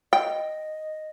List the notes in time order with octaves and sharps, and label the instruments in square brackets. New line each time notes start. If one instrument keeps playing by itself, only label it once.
[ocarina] D#5 [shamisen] G5